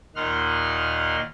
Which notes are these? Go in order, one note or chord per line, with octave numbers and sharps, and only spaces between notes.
D#2 A#2 D#4 F#5 C6 F6